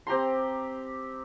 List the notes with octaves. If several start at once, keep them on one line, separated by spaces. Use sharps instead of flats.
C4 G4 A#5 C6